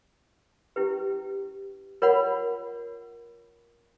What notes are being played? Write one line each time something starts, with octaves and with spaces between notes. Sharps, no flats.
C#4 E4 G4 B4
F4 A#4 C#5 F#5 B5